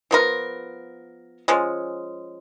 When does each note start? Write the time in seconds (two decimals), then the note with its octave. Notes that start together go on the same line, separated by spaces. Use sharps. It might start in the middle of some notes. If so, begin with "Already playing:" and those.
0.11 F3 B3 F4 A#4
1.48 F3 G#3 C#4